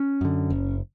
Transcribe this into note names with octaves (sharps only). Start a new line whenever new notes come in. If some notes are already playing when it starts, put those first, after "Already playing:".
Already playing: C#4
F#2 D3
F#1